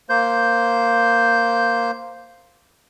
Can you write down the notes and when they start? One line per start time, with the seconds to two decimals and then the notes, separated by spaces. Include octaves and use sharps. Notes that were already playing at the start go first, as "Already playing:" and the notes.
0.10 A#3 C5 G6